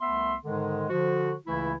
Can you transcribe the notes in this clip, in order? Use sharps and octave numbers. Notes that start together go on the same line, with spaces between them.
C2 A3 B3 E5 C6
G#2 D3 D#3 G#3
D3 F3 F#4
C#2 C#3 E3 A3 E4